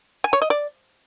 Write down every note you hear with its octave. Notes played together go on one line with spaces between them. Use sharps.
G#5
C#5
D#5
D5